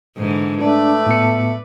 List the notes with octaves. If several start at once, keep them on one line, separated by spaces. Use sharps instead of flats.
G#2 D3 E3
A3 D4 B4 D5
A2 B3 C#7